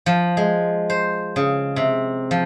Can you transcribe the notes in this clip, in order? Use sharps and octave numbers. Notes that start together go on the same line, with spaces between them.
F3
G#3
C5
C#3
C3
F3